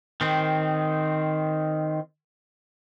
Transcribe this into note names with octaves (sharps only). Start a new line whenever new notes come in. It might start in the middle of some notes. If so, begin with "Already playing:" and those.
D#3 C4